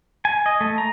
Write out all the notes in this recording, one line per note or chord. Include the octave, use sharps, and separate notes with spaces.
G#5
D#5
A3
A#5